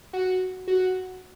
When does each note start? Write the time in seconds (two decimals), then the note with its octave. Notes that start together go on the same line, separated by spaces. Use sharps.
0.13 F#4
0.68 F#4